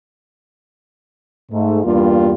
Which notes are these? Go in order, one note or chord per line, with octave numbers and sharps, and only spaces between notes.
G#2 A3
E2 G2 G3 A#3 F4 G4